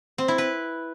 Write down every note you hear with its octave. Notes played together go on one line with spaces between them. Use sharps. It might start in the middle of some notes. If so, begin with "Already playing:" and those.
C4
E4
B4